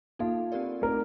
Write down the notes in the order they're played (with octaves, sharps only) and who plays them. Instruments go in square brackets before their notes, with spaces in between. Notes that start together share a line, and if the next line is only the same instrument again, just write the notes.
[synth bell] A#3 D#4 A4 [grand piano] F4
[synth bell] C4 G4 A#4 D5
[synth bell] A3 C4 D#4 [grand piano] A#4